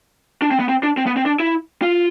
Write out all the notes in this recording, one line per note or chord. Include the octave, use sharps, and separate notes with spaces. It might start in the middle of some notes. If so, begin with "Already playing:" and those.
D4
C4
B3
C4
D4
C4
B3
C4
D4
E4
F4